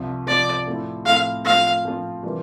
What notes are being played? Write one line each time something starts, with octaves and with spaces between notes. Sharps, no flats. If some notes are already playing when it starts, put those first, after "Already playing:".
Already playing: C2 C3 F3
C2 C3 F3 D5
A2 F3 C4 E4
A2 F3 C4 E4 F5
A2 F3 C4 F4 F5
A2 F3 C4 F4
C3 E3 G3 A#3 F4